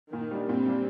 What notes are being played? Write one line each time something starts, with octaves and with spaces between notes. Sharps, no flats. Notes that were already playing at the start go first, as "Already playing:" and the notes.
A#2 D#3
G3 D4
A#2 C4
G3 D4